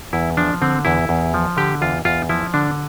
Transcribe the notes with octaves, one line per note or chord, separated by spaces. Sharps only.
E2 E4
F3 D4
D3 C4
E2 E4
E2
F3
D3 G4
E2 F4
E2 F4
F3 E4
D3 D4